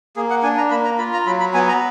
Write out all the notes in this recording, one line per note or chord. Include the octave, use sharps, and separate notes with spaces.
A#3 G#4
F#5
D4 G#5
A#5
A#3 B5
A#5
F4 B5
A#5
F#3 B5
B5
B3 G#5
A#5